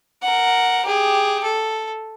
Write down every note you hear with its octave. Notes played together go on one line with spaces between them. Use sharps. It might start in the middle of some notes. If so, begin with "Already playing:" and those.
A#4 F#5
G4 G#4
A4